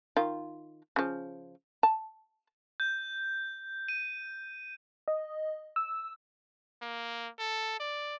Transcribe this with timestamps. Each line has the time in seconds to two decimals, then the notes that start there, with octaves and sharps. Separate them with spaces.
0.17 D#3 F4
0.96 C#3 F3
1.83 A5
2.80 G6
3.88 D#7
5.08 D#5
5.76 E6
6.82 A#3
7.40 A4
7.80 D5